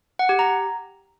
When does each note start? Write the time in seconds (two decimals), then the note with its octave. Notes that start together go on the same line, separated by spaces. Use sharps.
0.19 F#5
0.29 G4
0.39 A#5